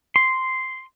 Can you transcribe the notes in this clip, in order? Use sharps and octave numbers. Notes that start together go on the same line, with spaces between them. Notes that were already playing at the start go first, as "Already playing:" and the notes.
C6